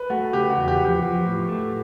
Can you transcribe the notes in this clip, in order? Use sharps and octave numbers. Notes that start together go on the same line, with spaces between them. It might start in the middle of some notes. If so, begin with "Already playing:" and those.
Already playing: B4
A3 F#4
C#3 G4
F#4
E2
G4
F3
G4
F3
A2
A3